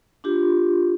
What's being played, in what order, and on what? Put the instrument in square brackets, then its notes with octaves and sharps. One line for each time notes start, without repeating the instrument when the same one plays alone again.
[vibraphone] D4 F4 G4